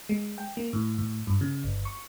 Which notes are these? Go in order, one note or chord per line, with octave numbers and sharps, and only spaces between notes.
G#3
G5
A#3
A2
A2
G2
C#3
G1
C#6